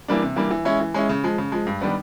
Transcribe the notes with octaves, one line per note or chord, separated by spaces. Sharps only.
E3 G3 A#3 D4
C3
E3 G3 A#3 D4
E3
G#3 C#4 E4
E3
G#3 C#4 E4
C#3
F3 G#3
C#3
F3 G#3
G2
D#3 G3 B3 D4